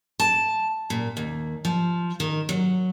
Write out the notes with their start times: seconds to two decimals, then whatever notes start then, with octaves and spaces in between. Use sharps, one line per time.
0.20 A5
0.90 A#2
1.17 D#2
1.65 F3
2.20 D#3
2.49 F#3